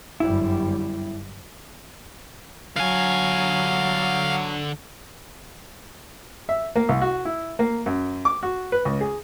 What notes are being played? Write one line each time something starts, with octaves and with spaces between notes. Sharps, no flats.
G1 F#2 G3 E4
D3 F#3 F5 G#5
E5
A#3
C2
F#4
E4
A#3
F#2
D6
F#4
B4
C#2
G#4